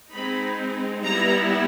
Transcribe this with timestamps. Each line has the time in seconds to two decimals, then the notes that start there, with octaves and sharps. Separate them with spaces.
0.11 G#3 C4 D#4 B5
1.04 G3 B3 E4 A#5